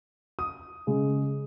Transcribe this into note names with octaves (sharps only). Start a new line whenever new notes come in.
D#6
C#3 G#3